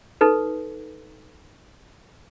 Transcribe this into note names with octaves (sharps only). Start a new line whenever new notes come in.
D#4 A4 B4